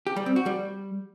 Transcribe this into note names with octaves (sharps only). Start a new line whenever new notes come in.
G4
G3
C4
F#4
G3